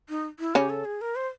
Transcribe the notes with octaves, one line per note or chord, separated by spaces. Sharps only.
D#4
E4
C#3 C#4 G4
A4
G#4
A#4
C5